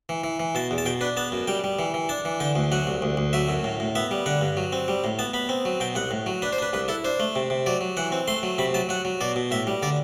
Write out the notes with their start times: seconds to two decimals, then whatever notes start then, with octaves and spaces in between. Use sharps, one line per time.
0.09 E3
0.24 E3
0.40 E3
0.55 B2 A5
0.71 E2
0.78 A5
0.86 B2 G5
1.01 D4 B4
1.17 B3 A5
1.32 F#2
1.47 G3 G5
1.64 G3
1.79 E3
1.94 E3
2.09 D4 A5
2.25 E3
2.40 D3 G5
2.55 D2
2.72 F#3 F#5
2.87 C2
3.02 D2
3.17 D2
3.33 F#3 E5
3.49 F#2
3.64 A2
3.80 A2
3.95 B3 E5
4.11 G3
4.26 D3 F#5
4.41 G2
4.57 F#3
4.72 C4
4.88 G3
5.04 A2
5.19 B3 A5
5.34 B3 B5
5.49 C4
5.65 F#3
5.80 B2 G5
5.95 C2 F#5
6.11 A2
6.26 F#3
6.42 D4 B4
6.53 C5
6.58 D4 B4
6.73 C2 B4
6.88 E4 A4
7.04 D4 C5
7.20 A3
7.36 C3
7.50 C3
7.66 F#3 D5
7.81 F#3
7.97 E3 F#5
8.12 C4
8.28 A3 C6
8.43 F#3
8.58 C3 B5
8.74 F#3 A5
8.89 F#3 F#5
9.05 F#3
9.21 B2 D5
9.36 B2
9.51 A2 E5
9.67 G3
9.82 D3 D5